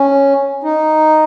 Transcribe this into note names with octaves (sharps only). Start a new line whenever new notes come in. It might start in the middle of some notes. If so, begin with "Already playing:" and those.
Already playing: C#4
D#4